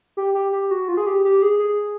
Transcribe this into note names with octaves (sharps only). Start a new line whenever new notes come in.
G4
G4
G4
F#4
F4
G#4
G4
G4
G#4
G#4